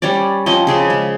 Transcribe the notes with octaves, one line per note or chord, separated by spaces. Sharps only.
G3 C#4 C#5 D5
F3 C4 C#4 D#5
C#3 G#4 D5
G#3